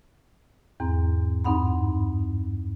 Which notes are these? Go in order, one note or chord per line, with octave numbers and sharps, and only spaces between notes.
E2 G#2 C4 A#5
E2 G2 C4 D#4 F#5 B5